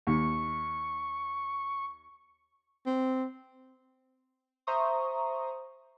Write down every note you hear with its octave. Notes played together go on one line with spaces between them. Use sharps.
D#2 C#6
C4
C5 E5 A#5 C6 C#6 D#6